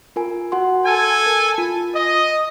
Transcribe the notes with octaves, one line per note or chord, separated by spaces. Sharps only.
F4 A#4 G#5
F#4 F#5 C6
A4 G#5 G#6
A#4
F4
D#5